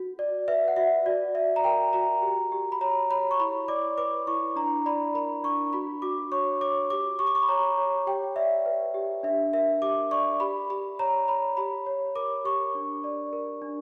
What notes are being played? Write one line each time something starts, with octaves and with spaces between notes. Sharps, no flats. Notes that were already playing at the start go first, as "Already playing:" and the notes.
Already playing: F#4
D5
B4 E5
F#5
F#4 E5
F#4 D5
D5 E5
A#5
A#4 G5
F#4 A#5
G4
G4
B5
C#5 A#5
C#5 B5
C#6
E4 B5
D5 D6
B4 D6
E4 C#6
D4 A#5
D5 B5
A#4 B5
D4 C#6
F#4 B5
F#4 D6
C#5 C#6
C#5 D6
G4 D6
G4 C#6
D6
C#6
B5
C#5 A#5
C#5
G4 G5
D5 E5
B4
G4
D4 E5
A#4 E5
G4 D6
D5 C#6
G4 B5
G4 B5
C#5 A#5
C#5 B5
G4 B5
C#5
A#4 D6
G4 C#6
D4
D5
A#4
D4